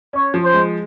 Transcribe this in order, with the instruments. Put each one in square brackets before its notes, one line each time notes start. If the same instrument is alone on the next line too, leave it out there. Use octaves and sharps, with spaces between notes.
[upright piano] C#4 [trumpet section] C#5
[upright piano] F3
[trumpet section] C5
[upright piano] G#3